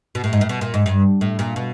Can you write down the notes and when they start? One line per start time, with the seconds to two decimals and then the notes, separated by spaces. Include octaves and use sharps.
0.15 B2
0.24 A2
0.33 G#2
0.41 A2
0.49 B2
0.61 A#2
0.74 G#2
0.86 G2
1.21 A2
1.39 A#2
1.56 B2